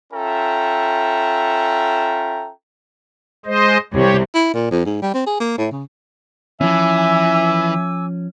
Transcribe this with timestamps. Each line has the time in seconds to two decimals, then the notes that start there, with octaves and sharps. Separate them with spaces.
0.13 C#4 F4 A4 E5 G5 A#5
3.46 G#3 C5 D#5
3.94 C2 C3 G4 C#5
4.35 E4
4.54 A#2
4.71 F2
4.85 G#2
5.02 G3
5.14 C4
5.26 G#4
5.40 A#3
5.58 A2
5.71 C#3
6.61 E3 F3 C#4 E5 G#5 D6 E6